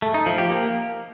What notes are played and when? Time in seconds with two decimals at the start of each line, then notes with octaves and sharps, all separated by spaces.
0.02 A3
0.14 D#4
0.26 F3
0.38 G4
0.50 A#3